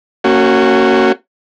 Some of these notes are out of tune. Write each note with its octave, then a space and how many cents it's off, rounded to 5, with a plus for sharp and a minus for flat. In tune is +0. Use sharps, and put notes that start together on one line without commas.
A#3 -25 C#4 -10 F#4 +15